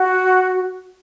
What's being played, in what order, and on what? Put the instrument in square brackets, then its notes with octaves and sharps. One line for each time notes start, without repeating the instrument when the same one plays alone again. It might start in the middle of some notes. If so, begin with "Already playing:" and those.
Already playing: [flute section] F#4